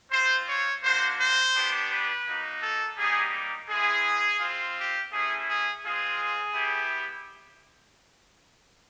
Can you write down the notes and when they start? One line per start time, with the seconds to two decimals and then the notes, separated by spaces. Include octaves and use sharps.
0.11 C4 F4 C5
0.48 C#5
0.82 A#3 D4 F#4 C5
1.19 C5
1.55 B3 D4 G4
1.90 B4
2.26 A#3 D#4 F#4
2.61 A4
2.97 G3 A#3 D#4 G4 G#4
3.69 G#3 C4 E4 G#4
4.40 C4 F4
4.76 G4
5.12 A3 C#4 E4 G#4
5.47 G#4
5.83 G#3 C4 F4 G#4
6.54 B3 E4 G4